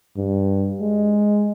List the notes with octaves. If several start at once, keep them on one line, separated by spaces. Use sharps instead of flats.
G2
G#3